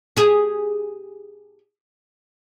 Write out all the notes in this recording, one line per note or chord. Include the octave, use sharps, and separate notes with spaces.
G4 G#4